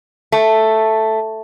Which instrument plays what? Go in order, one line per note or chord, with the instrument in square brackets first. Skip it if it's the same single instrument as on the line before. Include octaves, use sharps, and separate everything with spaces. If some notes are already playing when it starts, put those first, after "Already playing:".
[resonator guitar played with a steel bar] A3